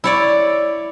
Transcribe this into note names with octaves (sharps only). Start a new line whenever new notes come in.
E4 C#5 D5